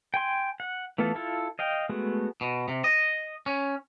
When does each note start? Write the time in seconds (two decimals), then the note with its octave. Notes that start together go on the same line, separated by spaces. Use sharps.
0.14 G5 G#5 C6
0.60 F#5
0.98 E3 A3 B3 F4 A4
1.15 E4 F4 A4
1.59 D#5 F5 G5
1.89 G#3 A3 B3 F#4
2.41 B2
2.68 C3
2.84 D#5
3.46 C#4